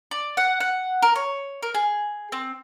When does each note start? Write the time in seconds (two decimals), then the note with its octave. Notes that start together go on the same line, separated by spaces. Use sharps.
0.11 D5
0.37 F#5
0.60 F#5
1.02 A#4
1.16 C#5
1.63 A#4
1.75 G#4
2.32 C4